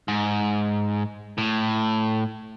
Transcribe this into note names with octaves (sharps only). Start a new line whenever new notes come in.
G#2
A2